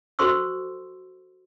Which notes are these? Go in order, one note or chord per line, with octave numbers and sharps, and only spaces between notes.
F#4 A4 C5 C6 C#6 E6